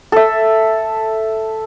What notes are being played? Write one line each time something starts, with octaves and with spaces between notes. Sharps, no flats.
A4 E5